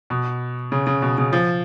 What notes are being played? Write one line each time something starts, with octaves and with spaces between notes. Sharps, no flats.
B2
C#3
C#3
B2
C#3
F3